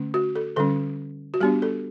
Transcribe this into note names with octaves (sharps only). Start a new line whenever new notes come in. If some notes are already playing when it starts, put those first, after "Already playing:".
Already playing: D3 A3 C#4
F#4
A4
D3 G3 C#4 A4
F#4
G3 B3 D4 G4
A4